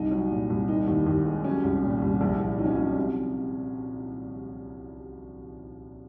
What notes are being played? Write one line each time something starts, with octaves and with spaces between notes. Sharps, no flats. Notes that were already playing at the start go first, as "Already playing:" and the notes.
Already playing: C2 D#4
F#3
A#2
C2
D#3 D#4
D#2
D#2
G#3
F#3 C#4
C2
A#2
C2
A#1
A#1
F#3 D#4
C#4
F#3 D#4
C3